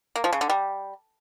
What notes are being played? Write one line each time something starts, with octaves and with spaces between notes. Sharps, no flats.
A#3
F3
C#3
D3
G3